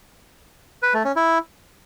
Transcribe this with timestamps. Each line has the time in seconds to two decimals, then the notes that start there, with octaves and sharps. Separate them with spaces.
0.82 B4
0.94 A3
1.05 C#4
1.16 E4